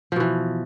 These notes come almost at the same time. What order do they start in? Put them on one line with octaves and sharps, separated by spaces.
F3 B2 E3